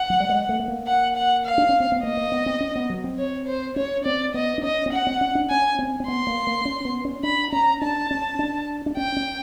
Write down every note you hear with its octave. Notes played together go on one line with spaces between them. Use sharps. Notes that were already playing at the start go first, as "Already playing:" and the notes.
Already playing: F#5
F#3
G3
G#3
A3
A3
A#3
F#5
F#5
F5
D4
C#4
C4
B3
A#3 D#5
A#3
B3
C4
C#4
B3
F#3
C4
C#5
C5
C#4 C#5
C4 D5
B3 D#5
D4
C#4 D#5
C4
C#4 F#5
C4
C#4
D4
C#4 G#5
C4
C4
B3 C6
A#3
A#3
C#4
B3
C#4
D4 B5
C#4 A#5
D4 A5
C#4
D4
D4
C#4 G5
C#4